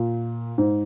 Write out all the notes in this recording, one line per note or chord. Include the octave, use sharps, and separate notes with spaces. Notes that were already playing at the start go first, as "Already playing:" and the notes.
Already playing: A#2
G#2